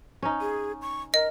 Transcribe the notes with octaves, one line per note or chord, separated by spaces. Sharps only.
C#4 D#4
G#4
C#6
A#4 D#5